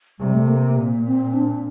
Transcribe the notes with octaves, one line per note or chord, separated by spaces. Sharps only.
C3 G3
A3
A#3
A#2
C4
D4